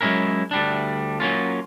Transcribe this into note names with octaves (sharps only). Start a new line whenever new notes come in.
F#3 G#3 C4 C#4 E4 A#4
D2 G3 D4
F#3 A#3 C#4 F4